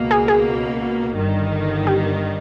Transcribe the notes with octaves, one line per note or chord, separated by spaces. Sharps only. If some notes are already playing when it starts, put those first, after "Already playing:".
Already playing: C#2 B2 A#3
G#4
G#4
G1 G2 D#3
G4